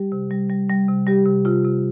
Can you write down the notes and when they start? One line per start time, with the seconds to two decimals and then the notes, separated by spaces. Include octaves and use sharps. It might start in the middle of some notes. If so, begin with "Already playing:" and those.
Already playing: G3 G4
0.12 C3
0.31 G3
0.50 G3
0.70 G3
0.88 C3
1.07 G3 G4
1.26 C3
1.45 C3 F4
1.64 C3